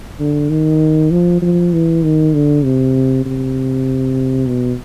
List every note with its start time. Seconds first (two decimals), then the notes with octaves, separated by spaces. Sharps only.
0.20 D3
0.50 D#3
1.11 F3
1.42 F3
1.73 E3
2.03 D#3
2.33 D3
2.64 C3
3.25 C3
4.47 B2